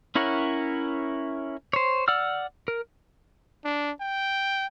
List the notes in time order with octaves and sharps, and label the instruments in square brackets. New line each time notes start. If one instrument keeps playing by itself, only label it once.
[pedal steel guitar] C#4 E4 A#4 C#5 F#5
C5 C#5
D5 F#5 E6 F6
A#4
[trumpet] D4
G5